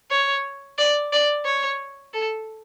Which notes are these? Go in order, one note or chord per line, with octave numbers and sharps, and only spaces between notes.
C#5
D5
D5
C#5
A4